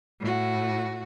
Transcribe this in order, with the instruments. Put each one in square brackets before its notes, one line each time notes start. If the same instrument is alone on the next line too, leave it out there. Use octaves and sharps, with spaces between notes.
[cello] A2 F#4